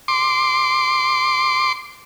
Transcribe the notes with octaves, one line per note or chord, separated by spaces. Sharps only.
C6 D6